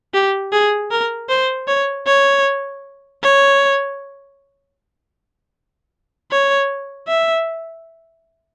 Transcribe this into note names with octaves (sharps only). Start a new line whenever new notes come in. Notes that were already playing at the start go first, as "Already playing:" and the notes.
G4
G#4
A#4
C5
C#5
C#5
C#5
C#5
E5